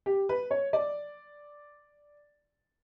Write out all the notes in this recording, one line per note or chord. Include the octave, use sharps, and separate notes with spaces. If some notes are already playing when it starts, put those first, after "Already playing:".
G4
B4
C#5
D5